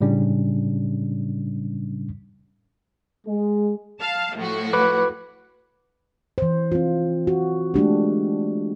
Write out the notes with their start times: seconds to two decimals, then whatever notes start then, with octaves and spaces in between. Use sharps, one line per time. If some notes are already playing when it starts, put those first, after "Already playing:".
0.01 A2 C#3 G3 C#4 D4
3.26 G#3
4.00 F5 A5
4.36 A2 F3 F#4
4.73 B4 D6
6.38 E3 C5
6.72 C4 F4
7.27 F#4
7.74 G#3 A3 D4 G4